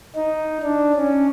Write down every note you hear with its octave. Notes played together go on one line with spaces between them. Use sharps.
D#4
D4
C#4